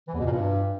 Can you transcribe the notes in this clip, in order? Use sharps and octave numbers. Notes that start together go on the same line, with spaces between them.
E3
E2
B2
A#2
G2